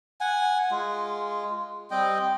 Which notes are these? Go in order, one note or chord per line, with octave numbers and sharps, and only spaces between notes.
F#5 G#5
G#3 F4
G3 C4 D#5 G5